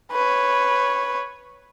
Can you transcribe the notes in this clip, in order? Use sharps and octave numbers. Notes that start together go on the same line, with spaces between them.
B4 C#5